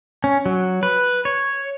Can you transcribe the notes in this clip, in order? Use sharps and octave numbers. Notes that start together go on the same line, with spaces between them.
C#4
F#3
B4
C#5